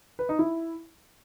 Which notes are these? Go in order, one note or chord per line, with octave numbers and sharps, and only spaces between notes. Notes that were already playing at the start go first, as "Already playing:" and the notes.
B4
D#4
E4